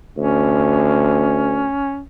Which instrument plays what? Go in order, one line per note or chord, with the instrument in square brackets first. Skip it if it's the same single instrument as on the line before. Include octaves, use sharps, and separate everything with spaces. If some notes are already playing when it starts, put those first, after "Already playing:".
[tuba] D2 [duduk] C#4